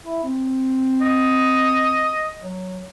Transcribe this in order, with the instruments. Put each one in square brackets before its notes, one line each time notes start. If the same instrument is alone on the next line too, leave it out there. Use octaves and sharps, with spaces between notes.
[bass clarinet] E4
C4
[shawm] D#5
[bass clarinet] F#3